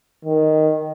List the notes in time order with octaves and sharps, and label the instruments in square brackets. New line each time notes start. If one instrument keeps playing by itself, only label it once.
[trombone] D#3